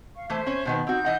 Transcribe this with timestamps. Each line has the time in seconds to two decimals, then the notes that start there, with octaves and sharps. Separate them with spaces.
0.17 F5 C#6
0.30 E3 A3 C5 E5
0.46 C#4 C#5
0.65 B2 D#3 B3
0.87 C4 D#4 F#4 G6
1.05 E3 D#5 F#5